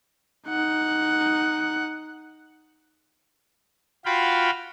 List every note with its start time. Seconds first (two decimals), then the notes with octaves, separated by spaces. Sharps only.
0.48 D#4 F#5
4.05 F4 F#4 F5 G5 B5